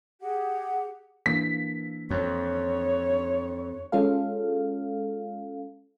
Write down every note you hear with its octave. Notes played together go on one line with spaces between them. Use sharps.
G4 G#4 F#5
E3 A#3 D4 B6
F2 C#5
G#3 C#4 F4 A4 F5